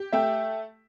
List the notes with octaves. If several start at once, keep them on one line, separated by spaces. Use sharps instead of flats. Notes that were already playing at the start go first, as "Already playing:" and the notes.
Already playing: G4
A3 E5 G5